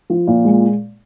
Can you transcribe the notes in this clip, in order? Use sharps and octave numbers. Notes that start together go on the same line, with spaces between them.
F3
A#2
G#3